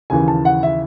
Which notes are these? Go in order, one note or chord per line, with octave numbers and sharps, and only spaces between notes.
D#2 C#3 E3 G#5
A5
F#5
E5